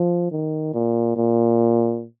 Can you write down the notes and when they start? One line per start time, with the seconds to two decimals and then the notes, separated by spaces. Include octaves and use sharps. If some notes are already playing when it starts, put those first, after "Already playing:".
Already playing: F3
0.31 D#3
0.74 A#2
1.16 A#2